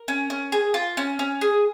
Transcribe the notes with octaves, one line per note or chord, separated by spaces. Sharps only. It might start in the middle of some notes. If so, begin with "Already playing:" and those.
Already playing: A#4
C#4
C#4
G#4
F4
C#4
C#4
G#4